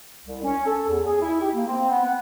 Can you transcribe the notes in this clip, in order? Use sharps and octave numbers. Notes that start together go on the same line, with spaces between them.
C2
C#4
A4
E2
G#4
E4
G4
A#3
C4
B3
F#5